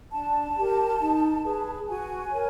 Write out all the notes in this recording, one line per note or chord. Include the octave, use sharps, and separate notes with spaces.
D4 A5
G4 A#4
D#4
G#4 B4
F#4 G#5
A#4 C#5